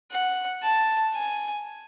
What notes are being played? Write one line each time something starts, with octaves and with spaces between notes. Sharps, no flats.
F#5
A5
G#5